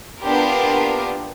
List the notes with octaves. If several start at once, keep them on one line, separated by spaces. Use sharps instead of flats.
A#3 B3 D4 F4 G4 A#4